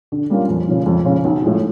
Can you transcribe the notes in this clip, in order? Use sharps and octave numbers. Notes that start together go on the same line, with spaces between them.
D3
G3 A#3 C#4 F4
F2
C#3 F3
F2
C#3 F3
B1
A2 F3 G#3